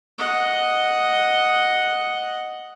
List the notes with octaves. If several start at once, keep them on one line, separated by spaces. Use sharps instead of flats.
D#5 F#5